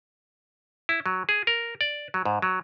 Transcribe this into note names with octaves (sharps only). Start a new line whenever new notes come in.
E4
F#3
G#4
A#4
D5
F#3
G#2
F#3